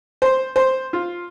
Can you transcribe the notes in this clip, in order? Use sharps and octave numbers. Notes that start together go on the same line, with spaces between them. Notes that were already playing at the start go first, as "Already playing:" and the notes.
C5
C5
F4